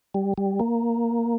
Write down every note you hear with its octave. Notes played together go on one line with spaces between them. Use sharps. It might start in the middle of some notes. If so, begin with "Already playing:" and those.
G3
G3
A#3